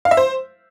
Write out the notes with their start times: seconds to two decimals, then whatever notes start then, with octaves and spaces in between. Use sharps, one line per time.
0.05 F5
0.11 E5
0.17 C5